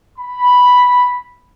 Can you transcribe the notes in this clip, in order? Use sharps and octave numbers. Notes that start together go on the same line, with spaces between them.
B5